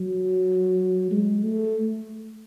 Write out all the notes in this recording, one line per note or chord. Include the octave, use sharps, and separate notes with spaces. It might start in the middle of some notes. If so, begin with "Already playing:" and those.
Already playing: F#3
G#3
A3